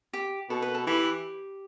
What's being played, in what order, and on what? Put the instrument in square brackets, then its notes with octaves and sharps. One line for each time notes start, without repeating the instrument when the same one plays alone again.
[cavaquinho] G4
[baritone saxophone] B2 [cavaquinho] A4
[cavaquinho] B4
A4
[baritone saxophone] E3 [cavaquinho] G4